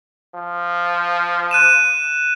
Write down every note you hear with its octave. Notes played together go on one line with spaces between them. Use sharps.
F3
F#6 D#7 E7